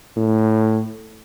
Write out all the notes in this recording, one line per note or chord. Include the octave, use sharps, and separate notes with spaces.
A2